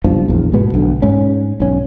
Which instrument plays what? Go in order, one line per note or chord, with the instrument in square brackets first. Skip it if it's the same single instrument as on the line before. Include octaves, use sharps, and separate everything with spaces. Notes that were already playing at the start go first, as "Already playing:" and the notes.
[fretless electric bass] F#1 G2 B2 F3
A#1 E2
G#2 B2 B3
B1 D3
G#2 C#4
B1 C#4